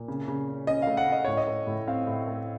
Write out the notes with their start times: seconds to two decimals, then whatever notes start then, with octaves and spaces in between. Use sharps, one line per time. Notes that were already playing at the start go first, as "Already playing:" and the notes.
Already playing: A#2
0.08 C#3
0.28 C#3
0.48 C#4
0.67 C#4 D#5
0.82 A3 F5
0.97 F#5
1.08 C#4 D#5
1.25 A2 C#5
1.37 D#5
1.47 A3
1.67 A2
1.87 C4 F5
2.07 A2
2.27 A3